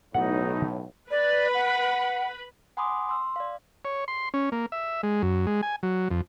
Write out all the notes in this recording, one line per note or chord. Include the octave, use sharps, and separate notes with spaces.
B1 A2 D#4 F#5
B4 D5 B5
F#5
F#5 G#5 B5 C6 D6 D#6
C6 E6
D5 F5
C#5
C6
C#4
A#3
E5
G#3
F#2
G#3
G#5
F#3
F2